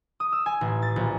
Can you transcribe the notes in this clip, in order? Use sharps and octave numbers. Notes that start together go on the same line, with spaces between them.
D#6
E6
G#5
A1
A6
A#1